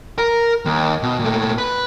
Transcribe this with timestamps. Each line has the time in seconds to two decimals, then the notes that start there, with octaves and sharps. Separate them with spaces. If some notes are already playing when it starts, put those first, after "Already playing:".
0.18 A#4
0.65 D#2
1.03 B2
1.20 A#2 A3
1.58 B4